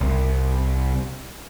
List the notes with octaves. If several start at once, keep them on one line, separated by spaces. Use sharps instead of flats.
C2